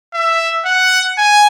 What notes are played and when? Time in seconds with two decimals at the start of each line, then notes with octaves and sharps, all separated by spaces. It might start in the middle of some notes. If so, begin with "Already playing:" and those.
0.14 E5
0.65 F#5
1.18 G#5